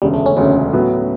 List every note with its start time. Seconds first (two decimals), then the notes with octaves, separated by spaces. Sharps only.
0.02 E1 D2 C#3 G3
0.14 A3
0.26 C#4
0.37 E1 D2 C#3 C#4
0.73 A2 F#3 B3